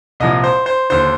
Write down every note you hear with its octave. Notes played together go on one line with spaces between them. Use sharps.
C2 A#2 F3 D#5
C5
C5
D#2 D3 C5